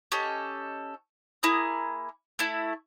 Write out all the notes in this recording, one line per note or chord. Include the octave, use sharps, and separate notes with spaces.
C#4 G4 A4 D#5
A#3 E4 G#4 D#6
A3 E4